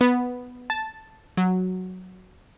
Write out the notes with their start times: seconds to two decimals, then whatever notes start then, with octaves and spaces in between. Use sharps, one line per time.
0.01 B3
0.70 A5
1.37 F#3